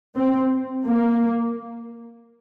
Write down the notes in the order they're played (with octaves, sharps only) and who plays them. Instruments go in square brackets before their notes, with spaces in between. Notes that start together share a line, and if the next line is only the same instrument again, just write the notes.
[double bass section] C4
A#3